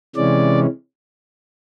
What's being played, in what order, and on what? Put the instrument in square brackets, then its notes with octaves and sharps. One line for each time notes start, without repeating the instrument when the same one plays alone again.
[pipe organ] C3 E3 G#3 C#4 D5